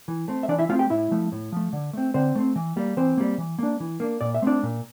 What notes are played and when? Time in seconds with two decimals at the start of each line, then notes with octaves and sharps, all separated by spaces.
0.08 E3
0.28 A3 C4
0.43 E5
0.49 E3 D4 D5
0.59 E4 E5
0.69 A3 C4 F4 F5
0.79 G4 G5
0.90 A2 E4 E5
1.11 F3 A3
1.32 A2
1.52 F3 A3
1.73 D3
1.93 A3 C4
2.14 D3 C4 C5
2.35 A3 C4
2.56 E3
2.77 G3 A#3
2.97 E3 C4 C5
3.17 G3 A#3
3.38 E3
3.59 A#3 D4
3.80 E3
4.00 A#3 D4
4.21 A#2 D5
4.35 E5
4.42 A3 C4 D4 D5
4.63 A#2